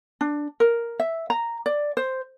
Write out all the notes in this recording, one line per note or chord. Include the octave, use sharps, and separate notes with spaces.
D4
A#4
E5
A#5
D5
C5